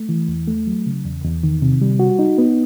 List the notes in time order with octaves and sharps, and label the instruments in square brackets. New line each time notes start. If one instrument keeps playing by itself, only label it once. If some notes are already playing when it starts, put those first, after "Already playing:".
Already playing: [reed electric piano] A3
E3
E2
A3
F#3
C#3
E2
E2
D#3
C3
G3
F#4
D#4
B3